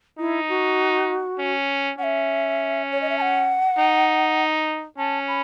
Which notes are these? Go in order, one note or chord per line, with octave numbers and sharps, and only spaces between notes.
D#4 E4
F#4
C#4
C#4 E5 F#5
C#5
D#5
E5
A5
F#5
D#4
C#4 A5
B5